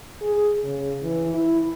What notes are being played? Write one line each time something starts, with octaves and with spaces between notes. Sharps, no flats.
G#4
C#3
E3
E4